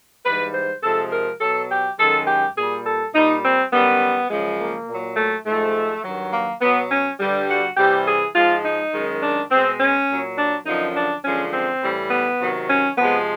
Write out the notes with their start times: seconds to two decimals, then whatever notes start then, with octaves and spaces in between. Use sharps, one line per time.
0.25 G#2 E3 G3 B4
0.54 C5
0.83 C3 F3 G#3 A4
1.12 A#4
1.41 B2 F#3 A4
1.70 G4
1.98 F#2 D#3 G#3 A4
2.27 G4
2.56 A#2 G3 G#4
2.86 A4
3.14 A#2 G3 D#4
3.43 C4
3.72 F#2 D#3 G3 B3
4.30 F#2 C#3 F3 G#3
4.59 A#3
4.88 A#2 F#3
5.16 A3
5.46 G#2 F3 G#3 A3
6.04 G2 D#3 F#3
6.32 A#3
6.61 B2 F#3 B3
6.90 C#4
7.20 G2 D3 G3
7.48 F#4
7.77 C3 E3 G3 G4
8.06 G#4
8.35 G#2 F3 G#3 F4
8.64 D#4
8.92 F#2 D#3 G#3
9.22 D4
9.50 B2 G#3 C4
9.79 C#4
10.09 A#2 F#3
10.37 D4
10.66 F#2 D3 F3 D#4
10.95 D4
11.24 F#2 D3 F3 G#3 C#4
11.53 C4
11.82 A2 E3 G3
12.11 B3
12.40 C3 D#3 F#3
12.69 C#4
12.98 C3 F3 G#3 B3